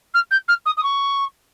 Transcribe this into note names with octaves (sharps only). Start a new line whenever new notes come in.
F6
G6
F6
D#6
D#6
C#6